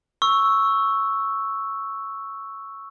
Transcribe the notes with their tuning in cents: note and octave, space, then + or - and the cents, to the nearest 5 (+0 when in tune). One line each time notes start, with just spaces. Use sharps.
C#6 +0 E6 +0